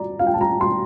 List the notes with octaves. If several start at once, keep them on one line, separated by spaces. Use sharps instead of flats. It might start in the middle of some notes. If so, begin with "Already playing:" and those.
Already playing: D5 A#5
F5
G5
A5
A#5
C6